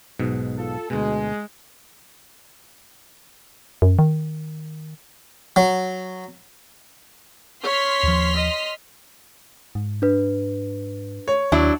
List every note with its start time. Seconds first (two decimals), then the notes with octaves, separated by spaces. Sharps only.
0.20 B1 G#2 B2
0.57 F4 A4
0.90 D2 B2 G#3
3.82 F#2
3.99 D#3
5.56 F#3
7.63 C#5 C6 F6 B6
8.03 D#2 F3
8.36 D#5
9.75 G#2
10.02 D4 B4
11.28 C#5
11.52 D#2 F#3 D4 E4